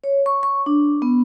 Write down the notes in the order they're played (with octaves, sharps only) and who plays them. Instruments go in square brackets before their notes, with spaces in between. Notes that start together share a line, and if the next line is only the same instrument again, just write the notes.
[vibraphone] C#5
C#6
C#6
D4
B3